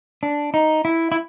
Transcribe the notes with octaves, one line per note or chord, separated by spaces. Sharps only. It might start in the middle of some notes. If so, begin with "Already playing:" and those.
D4
D#4
E4
E4